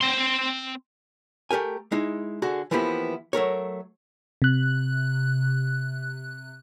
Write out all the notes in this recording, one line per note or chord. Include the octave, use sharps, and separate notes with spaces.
C4 C6
A3 G4 A#4 G#5
G#3 D#4 E4
D3 F#4 G#4
E3 F3 A#3 B3 E4 G4
F#3 A3 A#4 C#5
C3 F#6